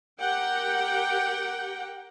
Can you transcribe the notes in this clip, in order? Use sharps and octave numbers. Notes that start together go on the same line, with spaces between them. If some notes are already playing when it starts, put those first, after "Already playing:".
G4 A#4 F#5 G5